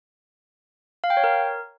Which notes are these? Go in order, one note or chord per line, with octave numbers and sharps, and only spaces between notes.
F5
G5
C#5
A#4